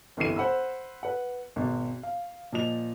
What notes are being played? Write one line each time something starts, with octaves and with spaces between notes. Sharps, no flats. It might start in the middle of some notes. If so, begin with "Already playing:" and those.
G1 C2 F2 E3 C7 D#7
C5 F#5 B5 E6
B4 F#5
G#1 B2
F5
A#2 F3 D#5 F7